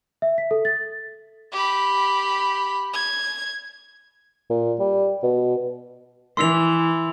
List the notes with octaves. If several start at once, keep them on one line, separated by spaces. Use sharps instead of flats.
E5
B6
A4
A6
G4 B5
G#6
A#2
G3
B2
E3 C6 E6 F7